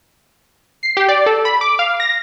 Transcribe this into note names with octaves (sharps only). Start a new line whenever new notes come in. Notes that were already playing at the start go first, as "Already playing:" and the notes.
C7
G4
D5
A4
B5
D6
F5
A#6